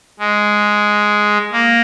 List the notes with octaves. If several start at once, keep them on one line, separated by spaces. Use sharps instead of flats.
G#3
A#3